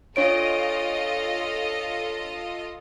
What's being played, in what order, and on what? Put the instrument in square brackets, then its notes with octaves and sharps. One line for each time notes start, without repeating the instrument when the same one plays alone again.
[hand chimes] D4 C#5 D7 [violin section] F4 A4 D#5